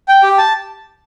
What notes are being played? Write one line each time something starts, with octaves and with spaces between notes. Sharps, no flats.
G5
G4
A5